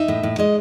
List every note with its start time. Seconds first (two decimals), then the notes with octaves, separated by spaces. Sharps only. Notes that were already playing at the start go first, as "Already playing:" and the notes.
Already playing: D#4 E5
0.08 A2
0.23 A2
0.38 G#3 D#5